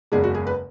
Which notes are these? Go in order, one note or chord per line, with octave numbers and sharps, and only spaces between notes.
F#1 E2 C#3 G#3 G#4
F#4
G#4
B4